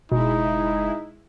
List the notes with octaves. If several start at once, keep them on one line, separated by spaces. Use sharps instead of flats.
F#1 B2 G#3 D#4 E4